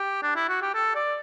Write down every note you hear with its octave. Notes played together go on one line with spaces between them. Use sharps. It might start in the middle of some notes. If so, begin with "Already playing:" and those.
Already playing: G4
D4
E4
F#4
G4
A4
D5